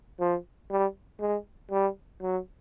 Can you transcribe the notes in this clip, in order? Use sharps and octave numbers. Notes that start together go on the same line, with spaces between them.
F3
G3
G#3
G3
F#3